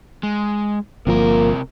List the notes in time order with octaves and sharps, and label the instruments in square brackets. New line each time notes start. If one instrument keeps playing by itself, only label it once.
[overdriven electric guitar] G#3
[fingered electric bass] G1 F3 [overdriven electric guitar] C3 A#4 [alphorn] A#3